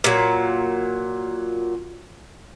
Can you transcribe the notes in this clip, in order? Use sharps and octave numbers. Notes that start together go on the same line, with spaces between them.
A#2 F#3